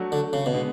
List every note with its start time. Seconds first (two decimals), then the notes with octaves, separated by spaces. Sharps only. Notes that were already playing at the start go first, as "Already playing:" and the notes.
Already playing: F#3 A3 D4 F#4
0.12 D3
0.33 C#3
0.46 B2
0.54 D3 G#3 B3